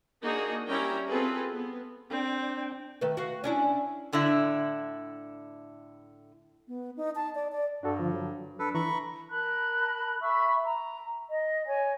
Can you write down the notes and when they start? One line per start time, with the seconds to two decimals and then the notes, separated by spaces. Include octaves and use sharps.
0.23 A#3 D4 D#4 F#4 G#4
0.68 G3 C#4 E4 A#4 G5 A#5
1.08 C4 F4 G#4 A4 B4
1.52 B3
2.11 C4 D4 G5
3.01 D#3 A3 B4
3.17 F#4 F5
3.44 C#4 D4 E4
4.13 A2 D3 D4 E4
6.68 B3
6.97 D#4
7.15 A5
7.35 D5
7.52 D5
7.83 G2 D4 F#4 A4
7.99 D3 F3
8.14 F#3
8.59 D4 A4 B4
8.75 E3 A#5 B5 C#6
9.30 A#4 A5 B5 F#6
10.22 E5 B5 C#6 E6
10.64 A#5
11.30 D#5
11.67 C#5 G#5